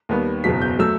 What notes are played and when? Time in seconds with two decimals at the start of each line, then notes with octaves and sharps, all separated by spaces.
0.09 D#2 D#3 G3 B3
0.44 F#1 E2 B2 F#3 B6
0.61 G6
0.79 F#3 A3 E6